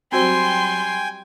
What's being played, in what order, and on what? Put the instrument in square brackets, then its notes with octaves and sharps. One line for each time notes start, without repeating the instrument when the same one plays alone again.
[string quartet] F#3 G3 C6 [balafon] C4 F#4 C5 [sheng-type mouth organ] G5 G#5